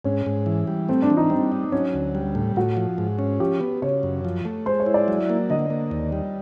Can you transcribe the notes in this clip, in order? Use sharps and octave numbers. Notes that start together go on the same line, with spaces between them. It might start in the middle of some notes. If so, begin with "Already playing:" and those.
G#2 C#4
G#2
E3
G3
A3 C4
D4
E3
D#4
G3 C4
D#4
F#3 C#4
D2
G3
A2
A2 F#4
F3
G#2
C#4
F3 G4
B3
C#3 C#5
F#2
F3
A3
G#3 C5
C#5
E4
D5
F#3
A#3
D3 D#5
A#3
D#2
G3